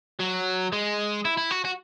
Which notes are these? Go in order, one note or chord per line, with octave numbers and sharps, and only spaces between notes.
F#3
G#3
E4
E4
F#4
F#4